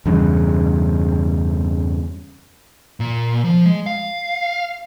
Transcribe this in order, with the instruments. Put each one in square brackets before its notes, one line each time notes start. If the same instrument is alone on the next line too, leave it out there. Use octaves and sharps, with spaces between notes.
[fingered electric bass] E2 G2 C#3
[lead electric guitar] A#2
F3
G#3
F5